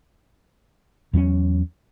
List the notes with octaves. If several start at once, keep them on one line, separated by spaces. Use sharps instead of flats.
E2 F#3 A#3 C#4